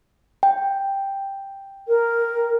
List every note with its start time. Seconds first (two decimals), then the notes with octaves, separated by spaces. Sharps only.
0.43 G5
1.88 A#4